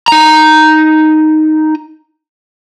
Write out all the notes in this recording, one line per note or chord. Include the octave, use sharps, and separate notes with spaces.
D#4 A#5